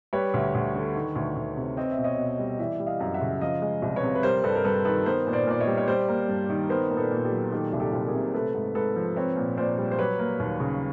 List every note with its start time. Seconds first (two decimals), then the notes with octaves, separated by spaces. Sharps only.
0.13 G3 B4 C#5
0.34 D2
0.55 D2
0.75 D3
0.95 D#3
1.15 D2
1.36 D2
1.57 C3
1.77 C4 D#5
1.91 E5
1.98 B2
2.04 C#5 D#5
2.18 B2
2.39 G3
2.59 E3 D5 E5
2.80 G3
2.86 D#5 F5
3.00 F#2
3.14 E5 F#5
3.21 C#3
3.41 F3 D#5 F5
3.62 G#3
3.82 C2
3.96 B4 C#5
4.03 C3
4.15 B4
4.23 G3 A#4 C5
4.44 G2 A4 B4
4.55 A#4
4.65 G2 A4 B4
4.85 D#3 A4 B4
5.05 B3 A#4 C5
5.27 A#2
5.33 C5 D5
5.47 A#2 D5
5.60 C#5 D#5
5.67 G3
5.78 C#5
5.88 G3 C5 D5
6.08 A#3
6.29 G2
6.49 D#3
6.69 B3 A#4 C5
6.90 A#2 A#4
6.97 A4 B4
7.11 A#2
7.25 G4 A4
7.32 F#3
7.52 D#3 G4 A4
7.73 C2
7.80 G4 A4
7.93 C2
8.07 G#4 A#4
8.14 C3
8.34 A3 A4 B4
8.55 G#2
8.75 G#2 A4 B4
8.96 F3
9.16 C4 B4 C#5
9.36 A#2
9.57 A#2 C5 D5
9.78 G3
9.92 C5
9.98 F#3 B4 C#5
10.19 A#3
10.40 D#2
10.60 C#3